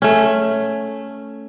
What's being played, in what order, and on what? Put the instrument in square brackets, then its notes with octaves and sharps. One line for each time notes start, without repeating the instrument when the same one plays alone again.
[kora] A3 C#4